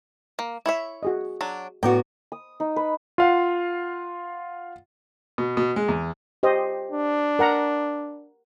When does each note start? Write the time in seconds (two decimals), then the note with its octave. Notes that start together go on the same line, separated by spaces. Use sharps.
0.39 A#3
0.66 E4 C#5 E5
1.03 F#4 G#4 D#5
1.41 F#3 D4
1.83 A2 B3 F#4 D5 G5 A#5 D6
2.32 D#6
2.60 D#4
2.76 B4
3.18 F4 F5 F#5
5.38 B2
5.57 B2
5.76 G#3
5.88 E2
6.43 G4 C5 D#5
6.92 D4
7.39 A#4 F#5 A#5